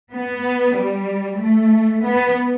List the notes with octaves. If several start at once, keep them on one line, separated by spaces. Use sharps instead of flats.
B3
G3
A3
B3